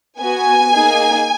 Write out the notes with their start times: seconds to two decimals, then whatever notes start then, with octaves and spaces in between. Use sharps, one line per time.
0.19 B3 F#4 G#5
0.72 A#3 D#4 G#4